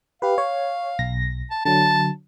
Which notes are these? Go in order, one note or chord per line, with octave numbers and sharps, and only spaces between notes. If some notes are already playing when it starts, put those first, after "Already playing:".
G4 B4 F5
C#5
B1 A#6
A5
D3 F#3 A5